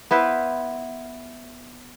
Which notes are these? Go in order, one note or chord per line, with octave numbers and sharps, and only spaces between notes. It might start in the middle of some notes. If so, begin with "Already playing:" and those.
B3 E4 B4 C5